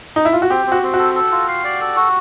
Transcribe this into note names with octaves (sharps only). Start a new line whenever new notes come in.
D#4
E4
F4
F#4
C4 G4
C4
F#4
C4
F#4
A4
A4
F4
F5
D5
A4
F#4